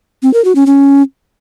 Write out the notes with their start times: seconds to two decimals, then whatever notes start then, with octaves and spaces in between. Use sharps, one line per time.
0.23 C4
0.34 A#4
0.45 F#4
0.55 C#4
0.66 C#4